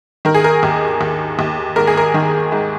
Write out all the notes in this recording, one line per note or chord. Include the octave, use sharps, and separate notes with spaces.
D#3 A#4
G#4
A#4
D#2
D#2
D#2
G#2 A#4
G#4
A#4
D#3
G#2